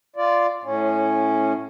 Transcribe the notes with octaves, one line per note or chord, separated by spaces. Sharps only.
F4 D5
A2 C#4